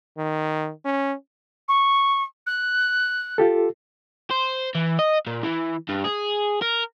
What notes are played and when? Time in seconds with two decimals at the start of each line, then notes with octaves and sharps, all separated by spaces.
0.18 D#3
0.85 C#4
1.68 C#6
2.47 F#6
3.38 F4 G4 A4
4.31 C5
4.75 E3
4.99 D#5
5.27 A#2
5.43 E3
5.89 G2
6.04 G#4
6.62 A#4